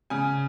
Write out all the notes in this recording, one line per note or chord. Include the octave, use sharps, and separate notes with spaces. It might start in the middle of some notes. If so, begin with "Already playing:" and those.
C#3 G#5